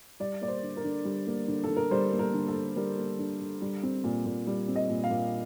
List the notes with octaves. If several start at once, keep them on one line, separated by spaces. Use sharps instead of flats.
G3 D5
A#3 D5
C5
D3
A#4
D3
G3
A#3
D3
A4
D3
A#4
G3 C5
A#3
A#4
D3
A4
D3
G3 A#4
A#3
D3
D3
G3
C4
A#2
A#2
G3
C4
D#5
A#2
F5
A#2